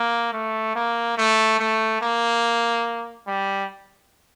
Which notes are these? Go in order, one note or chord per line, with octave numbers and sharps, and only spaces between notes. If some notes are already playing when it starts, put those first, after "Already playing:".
Already playing: A#3
A3
A#3
A3
A3
A#3
G3